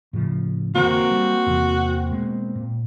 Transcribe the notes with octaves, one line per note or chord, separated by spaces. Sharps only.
A2 C#3 F3
F1 D3 E3 A#3 C4 F#4 A#4
G3
E2 C3 E3
B2 G#3
A#2